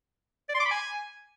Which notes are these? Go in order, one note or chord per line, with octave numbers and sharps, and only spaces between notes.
D5
C6
D6
B5
G#5